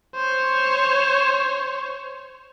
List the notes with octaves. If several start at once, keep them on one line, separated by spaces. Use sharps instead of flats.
C5 C#5